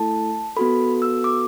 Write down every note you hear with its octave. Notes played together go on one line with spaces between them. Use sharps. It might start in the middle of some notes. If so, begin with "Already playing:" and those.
Already playing: A3 E4 A4 A5
B3 F#4 A4 B5
E6
D6